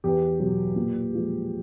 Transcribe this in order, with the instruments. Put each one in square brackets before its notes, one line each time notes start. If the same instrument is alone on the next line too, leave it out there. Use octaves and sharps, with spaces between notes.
[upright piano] E2 G4
B2 F#3
A#2
F3 G#3